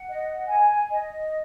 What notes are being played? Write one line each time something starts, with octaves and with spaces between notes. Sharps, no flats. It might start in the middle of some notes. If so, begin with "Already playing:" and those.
Already playing: F#5
D#5
G#5
D#5